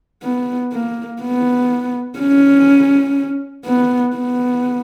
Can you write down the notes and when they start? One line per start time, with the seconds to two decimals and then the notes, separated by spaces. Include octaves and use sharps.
0.23 B3
0.72 A#3
1.22 B3
2.19 C#4
3.66 B3
4.15 B3